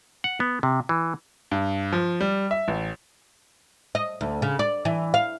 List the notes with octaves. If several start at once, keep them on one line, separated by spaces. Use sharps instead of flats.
F#5
B3
C3
E3
G2
F3
G3
E5
A1
D#5
D2
C#3
D5
E3
F5